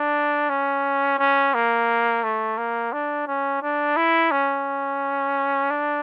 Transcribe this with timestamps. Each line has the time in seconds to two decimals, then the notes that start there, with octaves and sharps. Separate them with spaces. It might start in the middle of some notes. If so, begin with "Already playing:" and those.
Already playing: D4
0.50 C#4
1.19 C#4
1.54 A#3
2.23 A3
2.58 A#3
2.92 D4
3.27 C#4
3.62 D4
3.97 E4
4.31 C#4
5.70 D4